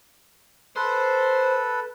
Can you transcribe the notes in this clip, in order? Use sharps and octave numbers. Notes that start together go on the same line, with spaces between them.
A4 B4 C5